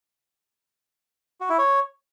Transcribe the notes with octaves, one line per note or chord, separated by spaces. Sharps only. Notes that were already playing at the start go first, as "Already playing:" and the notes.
F#4
E4
C#5